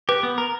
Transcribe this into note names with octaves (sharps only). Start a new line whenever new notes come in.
G4 B4
B3
A#4